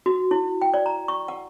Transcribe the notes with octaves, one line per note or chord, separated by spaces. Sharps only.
F#4
E4
G5
D5
A#5
C#6
F#5